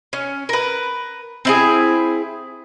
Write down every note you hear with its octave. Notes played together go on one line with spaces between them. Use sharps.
C#4
A#4 B4
C4 E4 G#4